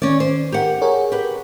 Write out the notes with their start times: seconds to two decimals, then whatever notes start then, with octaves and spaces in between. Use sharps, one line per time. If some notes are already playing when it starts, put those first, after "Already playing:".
0.02 D#3 C#4 D5
0.20 C5
0.52 G4 A#4 F#5
0.81 G#4 A#4 C#5
1.12 G4 B4